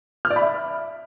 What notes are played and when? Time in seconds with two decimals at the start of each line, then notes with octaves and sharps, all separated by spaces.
0.25 F6
0.30 D5
0.36 B5
0.42 E5